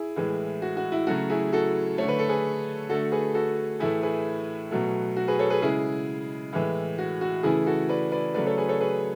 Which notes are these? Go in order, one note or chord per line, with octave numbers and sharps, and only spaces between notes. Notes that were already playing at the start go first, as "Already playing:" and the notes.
Already playing: E4 G#4
A2 E3 G#3
F#4
F#4
E4
C#3 F#3 A3 F#4
E4 G#4
F#4 A4
D3 A3 C#5
B4
A4
G#4 B4
D3 A3 F#4 A4
G#4 B4
F#4 A4
A2 E3 A3 E4 G#4
G#4 B4
B2 F#3 A3
F#4
G#4 B4
A4 C#5
G#4 B4
C#3 G#3 E4 G#4
A2 E3 G#3
F#4
F#4
C#3 E3 A3 E4 G#4
F#4 A4
B4 D5
B4 D5
C#3 F#3 A3 B4 D5
A4 C#5
G#4 B4
A4 C#5
G#4 B4